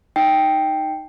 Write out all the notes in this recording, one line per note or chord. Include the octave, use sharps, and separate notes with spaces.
D#4 G5 C7